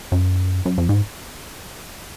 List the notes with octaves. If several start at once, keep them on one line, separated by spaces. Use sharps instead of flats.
F#2
F#2
F2
G#2